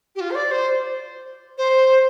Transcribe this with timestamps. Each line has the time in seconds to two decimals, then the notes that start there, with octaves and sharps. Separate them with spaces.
0.15 G4
0.20 F4
0.30 C5
0.35 D5
0.51 C5
1.57 C5